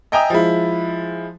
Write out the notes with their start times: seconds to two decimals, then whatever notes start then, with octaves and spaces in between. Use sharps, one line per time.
0.12 D#5 E5 G5 G#5 A#5 D#6
0.30 F3 G#3 E4